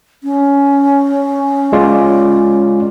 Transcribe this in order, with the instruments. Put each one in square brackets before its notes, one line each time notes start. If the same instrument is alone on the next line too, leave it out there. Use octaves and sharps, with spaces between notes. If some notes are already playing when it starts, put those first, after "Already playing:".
[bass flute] C#4
[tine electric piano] G#3 F4 D5